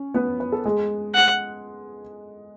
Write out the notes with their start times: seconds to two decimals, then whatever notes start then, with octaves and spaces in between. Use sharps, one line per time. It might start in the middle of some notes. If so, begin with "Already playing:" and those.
Already playing: C#4
0.14 B3 B4
0.40 B4
0.52 A4
0.65 G#3 G#4
1.15 F#5